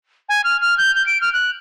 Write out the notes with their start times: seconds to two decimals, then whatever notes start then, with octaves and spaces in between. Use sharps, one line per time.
0.29 G#5
0.44 F6
0.61 F6
0.78 G6
0.95 G6
1.06 D7
1.21 F6
1.33 F#6